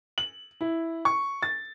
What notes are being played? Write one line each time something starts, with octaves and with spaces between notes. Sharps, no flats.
F#7
E4
C#6
A6